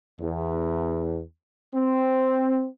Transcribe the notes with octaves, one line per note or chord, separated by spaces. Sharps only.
E2
C4